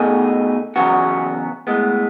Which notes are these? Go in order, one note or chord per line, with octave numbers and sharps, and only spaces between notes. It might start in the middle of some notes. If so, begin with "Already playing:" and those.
Already playing: B2 A3 D#4 G#4
E2 C#3 F#3 B3 F#4
A2 G#3 B3